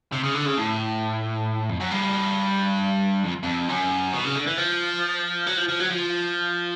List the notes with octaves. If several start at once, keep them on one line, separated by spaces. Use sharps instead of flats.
C3
C#3
D3
C#3
A2
F2
F#2
G2
F2
F2
F#2
B2
C#3
D3
E3
F3
F#3
F3
F3
F#3
F3